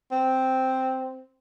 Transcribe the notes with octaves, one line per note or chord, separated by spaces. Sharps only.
C4